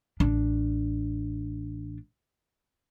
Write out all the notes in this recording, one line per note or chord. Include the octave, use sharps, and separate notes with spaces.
A1 D4